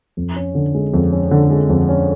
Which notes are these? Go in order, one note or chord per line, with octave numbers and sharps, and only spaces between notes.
F2
C#4
D3
G#3
F2
C#4
D3
G#3
F2
C#4